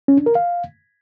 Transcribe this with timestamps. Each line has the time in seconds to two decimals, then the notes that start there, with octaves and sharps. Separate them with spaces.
0.08 C#4
0.17 D4
0.26 A#4
0.35 F5